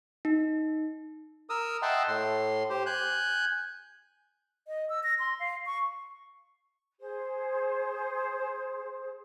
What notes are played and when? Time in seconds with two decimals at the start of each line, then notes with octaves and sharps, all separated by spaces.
0.25 D#4
1.50 A#4 D#6 E6
1.82 D#5 E5 F#5 G5 A5 C6
2.08 A2 C6
2.70 G4 C5
2.86 G#5 F#6 G6
4.67 D#5
4.89 E6
5.03 A#6
5.19 C6
5.40 F5
5.66 C#6
6.99 G#4 C5